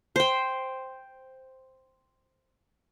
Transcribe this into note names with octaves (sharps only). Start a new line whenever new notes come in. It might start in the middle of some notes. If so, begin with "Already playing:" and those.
C5 G5